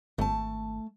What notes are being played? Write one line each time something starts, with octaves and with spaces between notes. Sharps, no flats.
G#1 A3 A5